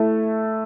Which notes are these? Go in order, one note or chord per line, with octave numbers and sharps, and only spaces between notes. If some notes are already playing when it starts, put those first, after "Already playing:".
Already playing: A3 E4 A4